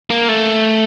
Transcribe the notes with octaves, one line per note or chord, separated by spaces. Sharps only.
A#3
A3